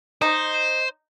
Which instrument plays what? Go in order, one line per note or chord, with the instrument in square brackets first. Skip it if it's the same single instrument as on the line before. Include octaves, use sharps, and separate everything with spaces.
[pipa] D#4 [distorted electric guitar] C5